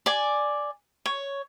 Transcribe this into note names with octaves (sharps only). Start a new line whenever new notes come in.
D5 G#5
C#5